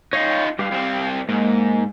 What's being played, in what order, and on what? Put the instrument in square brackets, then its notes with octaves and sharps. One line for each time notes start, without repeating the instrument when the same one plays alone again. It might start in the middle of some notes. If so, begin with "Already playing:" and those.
[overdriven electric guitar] D#4 F4 [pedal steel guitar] C#5 F5 G5
[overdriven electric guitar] G2 [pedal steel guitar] G4 F5
[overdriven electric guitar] C2 C4
[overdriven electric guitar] G#2 [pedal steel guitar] A#3